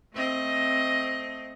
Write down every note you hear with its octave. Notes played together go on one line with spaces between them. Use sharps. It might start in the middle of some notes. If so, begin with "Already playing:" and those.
A3 C4 D#5